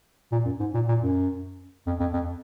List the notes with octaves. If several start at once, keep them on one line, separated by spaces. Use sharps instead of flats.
A#2
F#2
G#2
A#2
A#2
F#2
F2
F2
F2